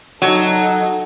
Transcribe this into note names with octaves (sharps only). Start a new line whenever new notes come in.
F#3 D#4 A4